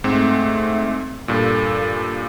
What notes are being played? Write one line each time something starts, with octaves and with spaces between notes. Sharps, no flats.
G#2 A3 C4
G2 A#2 A4